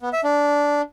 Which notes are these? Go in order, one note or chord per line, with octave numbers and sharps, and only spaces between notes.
B3
E5
D4